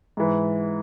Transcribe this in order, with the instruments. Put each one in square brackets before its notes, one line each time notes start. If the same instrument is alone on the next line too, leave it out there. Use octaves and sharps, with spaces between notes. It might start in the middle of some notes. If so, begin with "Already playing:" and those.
[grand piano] G#2 E3